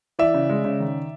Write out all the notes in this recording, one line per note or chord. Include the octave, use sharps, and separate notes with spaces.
E3 D5 E5
C#3
G#3
C#3
D#3